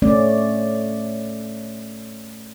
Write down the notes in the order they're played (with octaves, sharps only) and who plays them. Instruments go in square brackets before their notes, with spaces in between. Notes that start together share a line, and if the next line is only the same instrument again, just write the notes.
[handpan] A3 C#4 D5